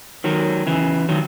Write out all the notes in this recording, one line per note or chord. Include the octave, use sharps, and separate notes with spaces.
D#3 F#3
C#3 E3
D#3 F#3